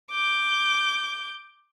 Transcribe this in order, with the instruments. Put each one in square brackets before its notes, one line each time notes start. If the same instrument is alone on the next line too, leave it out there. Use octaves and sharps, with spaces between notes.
[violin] D6 G6